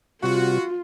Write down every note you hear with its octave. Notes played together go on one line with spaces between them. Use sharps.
C3 G3 F4 F#4